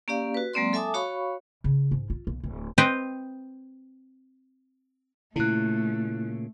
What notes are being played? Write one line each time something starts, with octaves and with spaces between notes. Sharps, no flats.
A#3 C#4 G4 D5 F5
F#4 B4
F#3 G#3 A#3 C4 D5 C6
A4 E5 G#5 A5 D6 D#6
F#4 C#5 F5 B5 C#6
C#3
G#2
F4
B1
D1
C4 B4 C5 D#5 G5
A#2 C#3 A3 E4 F#6